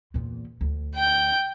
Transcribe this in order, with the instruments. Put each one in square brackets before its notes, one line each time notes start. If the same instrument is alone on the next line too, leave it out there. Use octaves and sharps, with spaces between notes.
[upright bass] E2 A#2
D2
[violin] G5 G6